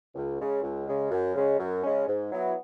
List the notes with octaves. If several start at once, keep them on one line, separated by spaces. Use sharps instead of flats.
C#2
C#3 G#3
C#2
C#3 G#3
F#2
C#3 G#3 C#4
F#2
C#3 G#3 C#4
G#2
F#3 B3 E4